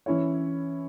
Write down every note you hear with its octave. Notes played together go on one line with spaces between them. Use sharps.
E3 C#4 E4 C#5